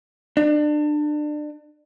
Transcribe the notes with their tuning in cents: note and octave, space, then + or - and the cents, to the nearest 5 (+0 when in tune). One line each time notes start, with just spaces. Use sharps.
D4 +30